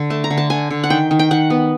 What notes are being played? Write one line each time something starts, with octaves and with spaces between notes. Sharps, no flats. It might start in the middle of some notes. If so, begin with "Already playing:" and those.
Already playing: D3
A3 A5
A#5
D3
A5
D3 G#5
D3
F#5
D#3 G5
D#3
G5
D#3 F#5
B3